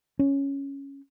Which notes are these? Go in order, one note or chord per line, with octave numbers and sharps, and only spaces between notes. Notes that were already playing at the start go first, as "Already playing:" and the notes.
C#4